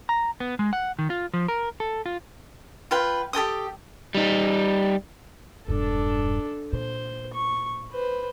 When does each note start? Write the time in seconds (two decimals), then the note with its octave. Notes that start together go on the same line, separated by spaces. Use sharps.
0.09 A#5
0.40 B3
0.59 G#3
0.73 F#5
0.99 D#3
1.10 F4
1.33 F3
1.48 A#4
1.80 A4
2.06 F4
2.91 F4 B4 G5
3.33 G4 A4 G5 D#6
4.15 G3 D#4
5.68 E1 G2 D4 A4
6.73 A#2 C5
7.34 C#6
7.92 B4 C5